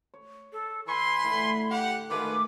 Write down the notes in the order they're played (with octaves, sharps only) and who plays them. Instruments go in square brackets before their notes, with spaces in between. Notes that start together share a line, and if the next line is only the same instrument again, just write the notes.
[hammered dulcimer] C#5
[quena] A4
[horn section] E3 G#5 C6 [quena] B5
[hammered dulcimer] A2 D3
[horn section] G4 F#5
[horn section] D#3 F4 B4 [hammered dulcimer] G#3 A3 F#4 [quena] D6